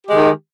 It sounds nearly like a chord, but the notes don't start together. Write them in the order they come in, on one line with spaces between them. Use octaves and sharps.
G4 G#3 D#3